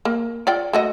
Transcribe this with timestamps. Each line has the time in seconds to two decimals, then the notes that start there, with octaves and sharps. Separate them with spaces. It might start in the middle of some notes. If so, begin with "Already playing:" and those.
0.05 A#3
0.47 F4 D5 G5
0.73 A3 F#4 D#5